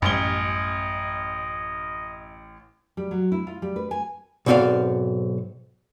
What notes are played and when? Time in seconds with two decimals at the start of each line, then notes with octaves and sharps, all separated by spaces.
0.02 A1 F#2 G3 C#4 D#5 G7
2.97 G3
3.11 F#3
3.32 E4
3.47 F4
3.62 G3
3.76 B4
3.91 G#5
4.46 B1 G#2 C4 F#4 D5 F5